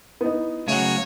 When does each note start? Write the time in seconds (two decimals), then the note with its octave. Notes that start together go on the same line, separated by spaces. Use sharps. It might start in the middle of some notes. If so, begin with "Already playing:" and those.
0.21 B3 D#4 E4
0.68 C#3 F#3 A3 C#5